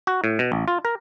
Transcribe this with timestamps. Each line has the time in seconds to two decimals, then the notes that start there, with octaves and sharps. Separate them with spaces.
0.07 F#4
0.24 A2
0.39 B2
0.52 A1
0.68 F4
0.85 A#4